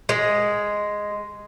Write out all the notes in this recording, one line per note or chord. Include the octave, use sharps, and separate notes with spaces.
G#3